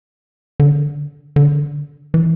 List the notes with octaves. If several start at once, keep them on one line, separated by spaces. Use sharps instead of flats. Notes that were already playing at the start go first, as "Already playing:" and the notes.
D3
D3
E3